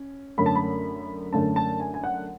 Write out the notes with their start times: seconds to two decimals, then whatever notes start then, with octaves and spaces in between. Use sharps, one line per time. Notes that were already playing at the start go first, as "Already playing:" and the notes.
Already playing: C#4
0.38 F#2 D3 A3 C#4 B5
0.46 A5
0.55 B5
1.32 F#2 D3 A3 C#4 A5
1.56 A5
1.80 G#5
1.94 G#5
2.04 F#5